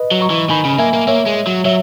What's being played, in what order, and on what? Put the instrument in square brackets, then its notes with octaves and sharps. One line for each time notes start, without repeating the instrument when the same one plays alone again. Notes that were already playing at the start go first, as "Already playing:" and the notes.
Already playing: [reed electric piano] B4 D#5
[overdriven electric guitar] F#3
[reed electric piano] A#5 C#6
[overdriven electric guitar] E3
[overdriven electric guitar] D#3 [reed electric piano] G#5 B5
[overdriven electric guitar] C#3
[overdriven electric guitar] A#3 [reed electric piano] E5 G#5
[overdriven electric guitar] A#3
[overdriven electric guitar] A#3 [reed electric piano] C#5 E5
[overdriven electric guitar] G#3
F#3
[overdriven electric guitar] F#3 [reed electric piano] C#5 E5